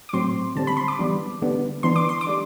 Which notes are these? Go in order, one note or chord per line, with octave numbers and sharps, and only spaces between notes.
D6
A2 F#3 C4 C6
D3 G3 C4 A5
B5
C6
D6
E3 G3 B3 D4
D3 G3 B3 D4
E3 B3 D4 C6
D6
C6
D6
G3 D4